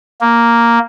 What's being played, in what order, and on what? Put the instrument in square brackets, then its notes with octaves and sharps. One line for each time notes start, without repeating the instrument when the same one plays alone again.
[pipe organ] A#3